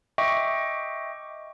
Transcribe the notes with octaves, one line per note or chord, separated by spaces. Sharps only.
D#5 E5 G5 C#6 D6